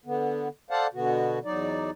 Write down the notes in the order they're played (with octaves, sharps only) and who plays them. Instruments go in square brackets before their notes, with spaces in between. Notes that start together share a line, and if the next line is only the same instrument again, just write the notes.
[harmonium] D3 B3
A4 C5 D5 F5 F#5 A5
B2 D3 B3 F#4
E2 F#3 D#4 D5